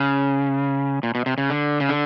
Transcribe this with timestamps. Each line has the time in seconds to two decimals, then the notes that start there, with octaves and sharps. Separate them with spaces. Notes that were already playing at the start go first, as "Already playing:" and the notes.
Already playing: C#3
1.03 A#2
1.15 B2
1.26 C3
1.38 C#3
1.50 D3
1.80 C#3
1.89 D3